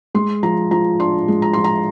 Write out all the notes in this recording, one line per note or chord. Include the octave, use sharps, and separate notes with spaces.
G#3 C6
F3 A#5
F3 A#5
D4 C6
G#3
A#5
F3 C6
A#5